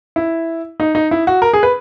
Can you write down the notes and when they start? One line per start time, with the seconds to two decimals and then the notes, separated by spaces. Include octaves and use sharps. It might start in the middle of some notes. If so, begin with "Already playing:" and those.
0.16 E4
0.80 D#4
0.95 D#4
1.11 E4
1.27 F#4
1.42 A#4
1.53 G#4
1.63 B4